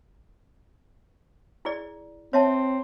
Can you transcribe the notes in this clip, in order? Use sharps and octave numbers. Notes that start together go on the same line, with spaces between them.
E4 G#4 D5
C4 C#5 E5 A5